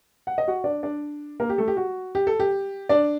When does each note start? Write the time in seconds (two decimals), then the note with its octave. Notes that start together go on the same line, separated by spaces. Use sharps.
0.27 F#5
0.38 D#5
0.48 F#4 F#5
0.64 D4 D5
0.83 D4 D5
1.40 A#3 A#4
1.49 G4
1.58 A3 A4
1.68 G4
1.77 F#4
2.15 G4
2.27 A4
2.40 G4
2.89 D4 D5